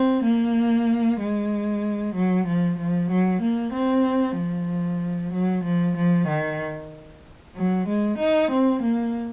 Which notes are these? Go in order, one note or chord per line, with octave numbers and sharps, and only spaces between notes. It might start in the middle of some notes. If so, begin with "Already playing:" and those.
Already playing: C4
A#3
G#3
F#3
F3
F3
F#3
A#3
C4
F3
F#3
F3
F3
D#3
F#3
G#3
D#4
C4
A#3